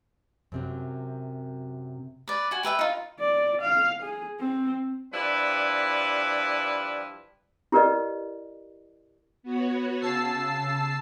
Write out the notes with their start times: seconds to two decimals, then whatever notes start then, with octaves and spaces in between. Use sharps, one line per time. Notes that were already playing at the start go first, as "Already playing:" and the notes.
0.52 F#2 C3 F#3
2.28 B4 D5
2.51 F#4 G#5
2.63 G4 B4 E5 G5
2.79 D#4 F4
3.20 D5
3.61 F5
4.03 G#4
4.40 C4
5.13 F3 G3 D4 E4 B4
7.72 E4 G4 A#4 B4 D5 D#5
9.43 B3 F#4 C#5
10.01 C#3 A5 E6 C7